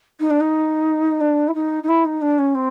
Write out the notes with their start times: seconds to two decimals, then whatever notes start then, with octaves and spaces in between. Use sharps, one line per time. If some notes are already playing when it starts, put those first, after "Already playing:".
0.20 D#4
0.30 D4
0.40 D#4
1.20 D4
1.48 E4
1.54 D#4
1.83 D#4
1.88 E4
2.05 D#4
2.21 D4
2.38 C#4
2.54 C4